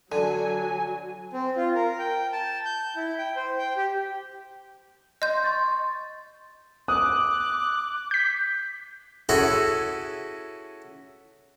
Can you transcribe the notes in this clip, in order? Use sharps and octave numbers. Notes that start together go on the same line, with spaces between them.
D3 F#3 G#5
C4
F4
A#4
G5
A5
G6
E4
G5
C5
G5
G4
D#5 C6 G6
C6 C#6 A6
D6 D#6 F#6
G6 B6
C#4 E4 F#4 G#4 A4